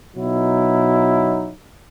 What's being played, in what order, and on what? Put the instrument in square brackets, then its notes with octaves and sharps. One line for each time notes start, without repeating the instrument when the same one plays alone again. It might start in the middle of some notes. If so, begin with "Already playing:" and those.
[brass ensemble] B2 F#3 D#4 E4